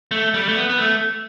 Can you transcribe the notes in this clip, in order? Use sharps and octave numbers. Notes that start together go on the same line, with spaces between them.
A3
G3
A3
B3
B3
A3